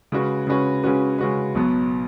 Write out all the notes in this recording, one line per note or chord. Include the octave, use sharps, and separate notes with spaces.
C#3 G#3 C#4 F#4 B4
C#3 G#3 C#4 F#4 B4
C#3 G#3 C#4 F#4 B4
C#3 G#3 C#4 F#4 B4
B1 B2 F#3 B3